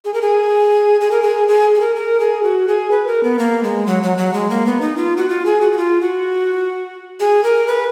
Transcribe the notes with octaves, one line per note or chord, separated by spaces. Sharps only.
G#4
A#4
G#4
G#4
A#4
G#4
G#4
G#4
A#4
A#4
G#4
F#4
G#4
B4
A#4
B3
A#3
G#3
F#3
F#3
F#3
G#3
A#3
B3
D#4
F4
F#4
F4
G#4
F#4
F#4
F4
F#4
G#4
A#4
B4